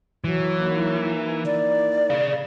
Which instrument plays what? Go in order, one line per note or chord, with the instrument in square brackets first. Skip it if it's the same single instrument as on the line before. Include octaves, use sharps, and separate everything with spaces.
[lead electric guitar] E3 [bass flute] F#3
[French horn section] A#3 D#4 E4
[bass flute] D5
[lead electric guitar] G#4 F5